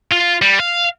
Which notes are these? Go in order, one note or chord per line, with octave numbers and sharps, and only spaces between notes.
F4
G3
F5